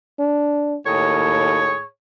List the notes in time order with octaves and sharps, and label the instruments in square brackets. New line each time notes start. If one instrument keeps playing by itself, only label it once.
[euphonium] D4
[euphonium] D#2 [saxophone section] A2 G#4 C#5